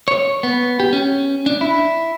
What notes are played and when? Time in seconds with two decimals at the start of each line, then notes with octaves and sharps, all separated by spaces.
0.08 C#5
0.43 B3
0.80 G4
0.93 C#4
1.46 D4
1.61 E4